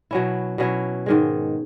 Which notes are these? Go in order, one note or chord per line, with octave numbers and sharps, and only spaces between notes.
B2 F#3 C#4 E4
B2 F#3 C#4 E4
G#2 D#3 G#3